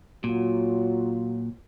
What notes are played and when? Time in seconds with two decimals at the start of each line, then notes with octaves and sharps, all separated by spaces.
0.24 A#2 F#3 F4